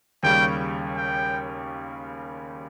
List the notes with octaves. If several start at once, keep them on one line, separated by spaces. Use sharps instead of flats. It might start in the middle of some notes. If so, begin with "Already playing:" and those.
D#2 C#3 G3 C#4 G5
G5